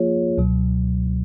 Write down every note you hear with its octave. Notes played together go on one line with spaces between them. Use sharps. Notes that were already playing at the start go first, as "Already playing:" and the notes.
Already playing: F3 A#3 F4 G#4 C#5
C#2 B2 F#3